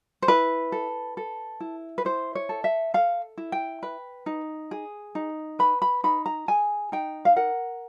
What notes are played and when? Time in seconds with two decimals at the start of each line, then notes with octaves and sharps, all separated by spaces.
0.22 C5
0.28 E4 B4
0.72 A4
1.17 A4
1.60 E4
1.98 B4
2.05 E4 C5
2.35 C#5
2.49 A4
2.64 E5
2.94 A4 F5
3.38 E4
3.52 G5
3.83 B4
4.26 D#4
4.71 G#4
5.15 D#4
5.59 B4 B5
5.82 B5
6.04 D#4 B5
6.26 A#5
6.48 G#4 G#5
6.92 D#4 G5
7.25 F5
7.36 A#4 F#5